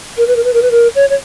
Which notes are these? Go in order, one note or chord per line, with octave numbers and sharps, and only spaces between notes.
A#4
B4
A#4
B4
A#4
B4
A#4
C#5
C#5